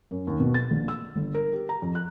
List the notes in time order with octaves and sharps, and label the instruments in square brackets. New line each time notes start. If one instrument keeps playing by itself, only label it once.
[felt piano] F#2
D#2
B2
A6
A#1
E6
G1
A#4
G4
A#5
F2
F#6